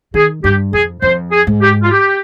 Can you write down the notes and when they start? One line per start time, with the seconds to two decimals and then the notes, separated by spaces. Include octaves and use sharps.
0.14 D#3 G#4
0.44 G2 G4
0.73 F2 G#4
1.02 F2 C5
1.31 G#4
1.47 G#2
1.61 G4
1.82 F4
1.91 G4